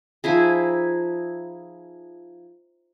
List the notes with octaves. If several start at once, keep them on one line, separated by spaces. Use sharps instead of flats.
F3 D#4 E4 G#4